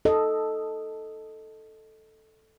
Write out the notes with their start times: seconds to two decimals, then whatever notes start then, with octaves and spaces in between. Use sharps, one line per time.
0.05 A4 D#5